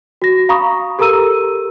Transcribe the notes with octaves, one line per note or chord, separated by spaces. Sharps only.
F#4 A#6
F5 A#5 B5 C#6 D#6
G4 A4 A#4 A#5 E6 D#7